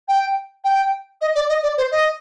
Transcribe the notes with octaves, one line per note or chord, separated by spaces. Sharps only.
G5
G5
D#5
D5
D#5
D5
C5
D#5